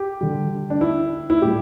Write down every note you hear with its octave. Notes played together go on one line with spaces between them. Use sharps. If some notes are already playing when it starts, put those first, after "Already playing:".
Already playing: G4
D3 G3
D4
E4
E4
A2 G3 G4